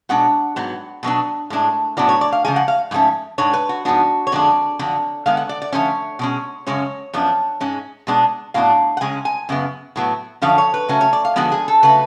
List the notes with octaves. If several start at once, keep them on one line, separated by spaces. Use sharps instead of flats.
B2 G#3 D4 F#5
G#2 F#3 B3
B2 F#3 B3 D4
A2 G#3 D4
A2 F#3 B3 D4 D5
C#5
D5
F5
C#3 F3 G#3 G#5
F#5
F5
G#2 F3 A3 C#4
G#2 G#3 D4 C#5
B4
F#4
G#2 F3 B3 D4 F#4
C#5
F2 D3 G#3 D4 D5
F2 D3 F#3
D3 G#3 B3 F5
F#5
D5
D5
D3 F3 A3 C#4 C#5
B2 G#3 C#4
F#2 C#3 G#3 C#4 C#5
F#2 F3 B3 D4
G#2 G#3 C#4
B2 G#3 B3 D4
A2 F#3 B3 D4 F5
F#5
C#3 G#3 C#4 G#5
G#5
F#2 C#3 B3
A2 F#3 B3
F#2 D3 F3 C#4 F5
C#5
B4
C#3 F#3 A3 C#4
C#5
D5
F5
D3 F3 G#3 B3 F#4
G#4
A4
C#3 F#3 A3 B4